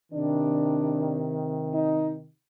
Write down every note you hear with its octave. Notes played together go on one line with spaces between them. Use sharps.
C3 D#3 D4
D#4